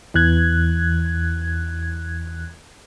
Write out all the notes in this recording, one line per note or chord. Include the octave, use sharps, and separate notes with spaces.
E2 E3 F#6 G#6